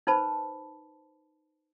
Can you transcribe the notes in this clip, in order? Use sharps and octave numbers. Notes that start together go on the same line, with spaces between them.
D#4 B4 C5 A5 B5